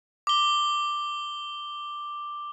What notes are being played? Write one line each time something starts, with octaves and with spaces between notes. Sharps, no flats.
D6 G7